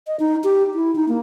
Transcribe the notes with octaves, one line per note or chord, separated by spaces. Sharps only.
D#5
D#4
G4
E4
D#4
A#3